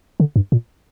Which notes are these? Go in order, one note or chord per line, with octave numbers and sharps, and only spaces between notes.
D3
G2
A#2